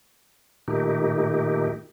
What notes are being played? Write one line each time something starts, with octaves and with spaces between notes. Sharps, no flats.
A#2 D#3 A3 D#4 G4